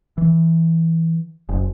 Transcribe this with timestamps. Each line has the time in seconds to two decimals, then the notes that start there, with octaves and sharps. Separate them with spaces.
0.18 E3
1.49 F#1